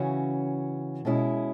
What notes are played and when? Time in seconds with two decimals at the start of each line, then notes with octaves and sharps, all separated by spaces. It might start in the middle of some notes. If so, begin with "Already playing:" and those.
Already playing: C#3 E3 C#4 F#4
1.05 B2 G#3 C#4 E4